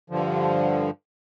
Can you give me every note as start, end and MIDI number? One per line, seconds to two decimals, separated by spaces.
0.10 0.90 43
0.10 0.90 50
0.10 0.90 53